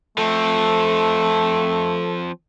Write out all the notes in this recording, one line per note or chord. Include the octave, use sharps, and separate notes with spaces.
F3 A3 C4 A4